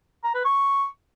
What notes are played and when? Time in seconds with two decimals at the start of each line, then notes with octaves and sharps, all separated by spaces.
0.24 A#5
0.35 B4
0.45 C#6